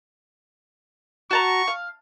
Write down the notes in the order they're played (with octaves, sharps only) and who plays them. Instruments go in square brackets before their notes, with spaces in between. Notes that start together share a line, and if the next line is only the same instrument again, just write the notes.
[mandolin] F#4 A5 A#5 [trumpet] C#6
[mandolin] F5